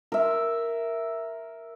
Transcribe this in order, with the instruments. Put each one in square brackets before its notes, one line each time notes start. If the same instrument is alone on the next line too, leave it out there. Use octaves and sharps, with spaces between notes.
[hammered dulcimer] A#4 E5